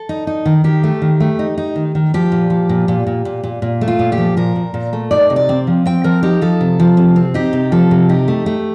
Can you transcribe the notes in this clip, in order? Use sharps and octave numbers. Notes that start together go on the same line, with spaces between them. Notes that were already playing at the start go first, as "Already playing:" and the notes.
Already playing: A4
D#4
D#4
D#3
D#3 G4
A3
D#3
A3
D#4
D#4
D#3
D#3
F3 G4
A#2
F3
A#2
A#2
A#2
A#2
A#2
A#2
A3
F4
A#2
G4
F3
A#2 A#4
A#2
A#2
A3
D#4 D5
C3
D5
C4
F3
C4 G5
F3 A#4
D#4 G4
F3 A4
C3
F3
C3
C4
D#4 G4
C3
F3 A4
C3
D#4 G4
A3
A3